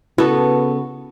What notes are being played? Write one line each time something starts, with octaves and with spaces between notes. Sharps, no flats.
C#3 B3 E4 F#4 A4